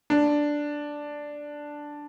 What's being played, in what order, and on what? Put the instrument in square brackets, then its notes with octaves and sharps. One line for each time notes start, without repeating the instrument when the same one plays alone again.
[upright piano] D4